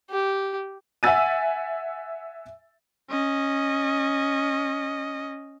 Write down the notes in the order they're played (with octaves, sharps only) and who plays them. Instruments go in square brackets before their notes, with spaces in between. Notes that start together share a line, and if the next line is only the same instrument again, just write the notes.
[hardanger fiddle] G4
[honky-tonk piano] E5 F#5 G#5 E6 A6 D#7
[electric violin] C#4 D#5